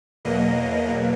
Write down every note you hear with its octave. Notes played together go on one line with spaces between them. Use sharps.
E2 B2 F#3 A#3 D#5